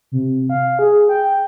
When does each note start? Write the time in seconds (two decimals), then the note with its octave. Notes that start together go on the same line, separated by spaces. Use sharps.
0.12 C3
0.50 F5
0.79 G#4
1.09 G5